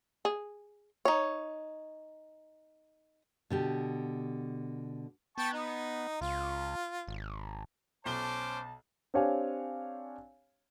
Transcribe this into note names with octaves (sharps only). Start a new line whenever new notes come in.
G#4
D#4 C#5
B2 D3 G4
B3 G5 A5 C#6
D#4
C#2 F4
G#1
B1 C#4 C5 A5 D6 G7
C4 D4 G4 C#5 F5 G#5